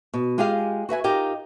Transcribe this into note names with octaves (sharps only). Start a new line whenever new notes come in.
B2
G#3 F4 G4 G#4 F5
F#4 B4 E5 G#5
D#4 F4 G4 A#4 D#5